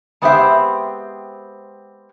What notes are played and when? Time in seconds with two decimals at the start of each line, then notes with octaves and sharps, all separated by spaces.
0.22 G#3 B3 C4 G4 C5 E5